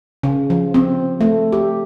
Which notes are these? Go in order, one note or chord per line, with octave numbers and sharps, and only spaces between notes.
C#3
F3
C4
A3
G4